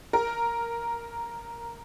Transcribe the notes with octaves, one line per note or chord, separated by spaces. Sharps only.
A#4